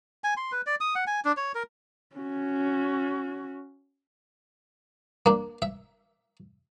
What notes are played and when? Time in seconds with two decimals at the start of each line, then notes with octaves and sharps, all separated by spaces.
0.24 G#5
0.37 C6
0.52 B4
0.67 D5
0.81 D#6
0.95 F#5
1.07 G#5
1.25 D4
1.37 C#5
1.55 A#4
2.16 C#4 F#4
5.26 A#3 D4
5.62 E5